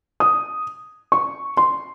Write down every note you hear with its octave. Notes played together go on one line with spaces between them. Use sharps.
D#6
C#6
C6